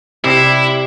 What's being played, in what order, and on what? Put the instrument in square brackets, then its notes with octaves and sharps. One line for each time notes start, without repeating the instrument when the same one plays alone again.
[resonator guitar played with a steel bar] C3 G3 [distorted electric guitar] E4